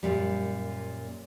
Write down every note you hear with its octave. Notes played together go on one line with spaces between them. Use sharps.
F#2 A#2 G3